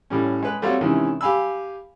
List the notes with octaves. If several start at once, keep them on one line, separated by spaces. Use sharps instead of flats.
A2 G3 C#4
G#3 B4 F#6
G3 A3 C4 F#4 C#5 F5
C3 D#3 E3 G#3 C#4
G4 F5 G#5 B5 E6